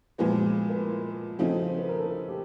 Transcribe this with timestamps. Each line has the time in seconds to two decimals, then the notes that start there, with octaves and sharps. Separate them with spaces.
0.18 A#2 F3 G#3 B3 B4
0.69 B4
0.79 A#4
1.39 C#3 F3 A3 C4 D#4
1.69 C5
1.78 B4
1.88 A#4
1.99 A4
2.28 G4